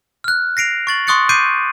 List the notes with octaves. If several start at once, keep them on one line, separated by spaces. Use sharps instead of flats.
F6 F#6
A#6 C7 D7 F7
C#6 A6 F#7
C6 C#6 D#6 F#6 A6 C#7
D6 G6 C7 D7 D#7